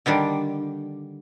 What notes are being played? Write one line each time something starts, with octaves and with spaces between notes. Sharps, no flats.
D3 D#3 G3 D4